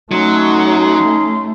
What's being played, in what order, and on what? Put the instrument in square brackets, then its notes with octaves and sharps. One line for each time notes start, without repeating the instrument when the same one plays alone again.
[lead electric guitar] F#3 [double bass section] A3 [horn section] C#4 C6 [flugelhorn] D#4